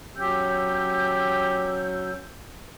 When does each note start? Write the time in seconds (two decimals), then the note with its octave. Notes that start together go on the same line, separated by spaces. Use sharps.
0.16 F#3 C#4 G4 E6 G6